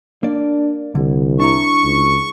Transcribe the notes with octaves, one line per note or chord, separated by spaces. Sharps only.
A#3 D4 D5
C2 D3
D4 E4 A#5 C#6
C#2